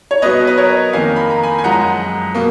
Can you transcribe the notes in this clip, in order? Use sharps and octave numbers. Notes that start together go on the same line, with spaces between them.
C#5
B2 F#3 B3 B4 D#5
B4
A#4 C#5
F2 D#3 A#3 F5 G#5
B5
A#5
G#5 B5
G#5
F#2 F3 G#3 F#5 A#5
B2 A#3